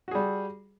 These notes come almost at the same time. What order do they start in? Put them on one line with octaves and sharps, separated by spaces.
F#4 G#4 G3